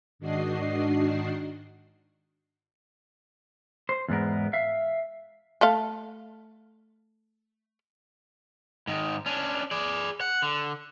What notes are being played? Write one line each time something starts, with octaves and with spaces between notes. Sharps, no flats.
G#2 D#3 D4 F#4 D#5 C7
C5
E2 G#2 B3 A#4
E5 F5
A3 A4 F5
G#2 D#3
C#4 D4
G#4 D5
F#5
D3